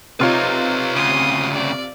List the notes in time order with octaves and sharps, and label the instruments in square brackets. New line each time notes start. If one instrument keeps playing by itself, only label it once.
[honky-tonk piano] C3 F4 [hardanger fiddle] D#4 [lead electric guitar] B4 C#5
[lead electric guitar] D2 C#3 [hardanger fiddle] C6 D#6
[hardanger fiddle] D5